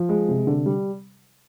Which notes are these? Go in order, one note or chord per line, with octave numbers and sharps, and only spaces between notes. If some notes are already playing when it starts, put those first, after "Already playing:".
Already playing: F3
G#3
C3
D3
G3